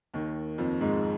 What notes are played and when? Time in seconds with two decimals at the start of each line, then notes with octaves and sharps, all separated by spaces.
0.14 D#2 D#3
0.58 F2 F3
0.81 G#2 G#3